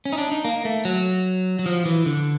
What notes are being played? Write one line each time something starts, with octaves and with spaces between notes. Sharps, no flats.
C#4
D#4
D4
D#4
A#3
A3
F#3
F#3
F3
E3
D3